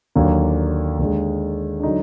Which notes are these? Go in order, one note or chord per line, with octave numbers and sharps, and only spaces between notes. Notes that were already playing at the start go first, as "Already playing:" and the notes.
D#2 D3 F#3 A#3
D#2 D3 G#3
D4
D3 F#3 D#4